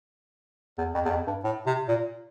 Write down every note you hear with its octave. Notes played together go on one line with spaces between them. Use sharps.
E2
F2
E2
F2
G2
A2
C3
A#2